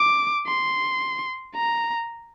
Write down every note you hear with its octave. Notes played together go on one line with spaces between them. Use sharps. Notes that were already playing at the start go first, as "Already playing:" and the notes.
Already playing: D6
C6
A#5